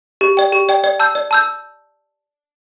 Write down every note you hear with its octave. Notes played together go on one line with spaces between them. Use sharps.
G4
D5 G5
G4
D5 G5
D5
A5 E6 G6
D5
A5 E6 G6